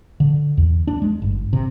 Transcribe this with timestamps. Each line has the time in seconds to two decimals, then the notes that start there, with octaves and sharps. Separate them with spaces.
0.20 D3
0.57 E2
0.87 D4
1.02 G#3
1.22 G1
1.53 C3